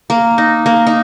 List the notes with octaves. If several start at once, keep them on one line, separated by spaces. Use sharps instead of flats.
A#3
D#4
A#3
D#4